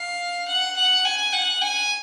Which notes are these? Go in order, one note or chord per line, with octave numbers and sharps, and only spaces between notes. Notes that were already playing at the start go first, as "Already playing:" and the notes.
Already playing: F5
F#5
F#5
G#5
F#5
G#5